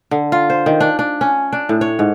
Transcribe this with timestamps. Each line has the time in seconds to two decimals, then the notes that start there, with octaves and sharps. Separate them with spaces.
0.11 D3
0.32 F4
0.50 C5
0.66 D#3
0.80 D4
0.99 D4
1.21 C#4
1.53 D4
1.69 A2
1.81 C#5
1.99 G#2